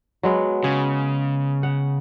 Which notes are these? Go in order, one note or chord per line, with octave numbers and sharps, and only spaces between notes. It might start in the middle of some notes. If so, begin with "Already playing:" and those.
F#3 G#3 B3
C#3 G#4
F#5